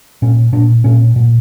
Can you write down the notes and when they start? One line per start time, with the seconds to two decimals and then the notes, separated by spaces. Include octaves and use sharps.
0.22 A#2 C#4
0.53 A#2 D4
0.84 A#2 C#4
1.16 A#2